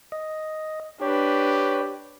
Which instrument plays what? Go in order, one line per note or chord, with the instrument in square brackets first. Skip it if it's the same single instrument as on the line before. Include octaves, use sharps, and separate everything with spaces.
[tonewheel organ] D#5
[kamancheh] D4 B4 [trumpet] G4 [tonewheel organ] C#5